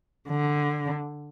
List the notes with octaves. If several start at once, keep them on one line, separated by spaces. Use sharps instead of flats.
D3